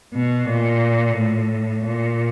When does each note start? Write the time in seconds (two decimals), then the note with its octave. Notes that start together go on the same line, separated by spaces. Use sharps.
0.14 B2
0.48 A#2
1.17 A2
1.85 A#2